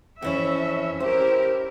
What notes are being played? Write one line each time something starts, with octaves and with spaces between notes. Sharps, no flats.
F2 E3 C#4 C#5 E5
E4 G4 A#4 C5